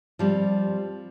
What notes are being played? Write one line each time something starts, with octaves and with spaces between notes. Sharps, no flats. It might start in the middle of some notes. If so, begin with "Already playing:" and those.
F3 G3 C4